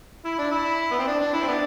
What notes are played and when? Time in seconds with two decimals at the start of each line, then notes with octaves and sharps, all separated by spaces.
0.25 E4
0.38 D4
0.51 E4
0.91 B3
0.99 C4
1.07 D4
1.20 D4
1.34 E4
1.41 C4
1.48 B3 D4